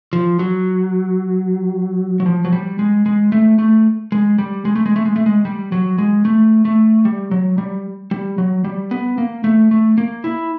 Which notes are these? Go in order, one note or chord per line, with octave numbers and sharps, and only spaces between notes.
F3
F#3
F#3
F3
F#3
G3
G#3
G#3
A3
A3
G#3
G3
G#3
A3
G#3
A3
G#3
A3
G#3
G3
F#3
G#3
A3
A3
G3
F#3
G3
G3
F#3
G3
B3
A#3
A3
A3
A#3
E4